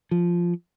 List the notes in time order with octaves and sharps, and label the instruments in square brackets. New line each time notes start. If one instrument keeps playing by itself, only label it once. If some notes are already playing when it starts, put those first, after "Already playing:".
[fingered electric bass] F3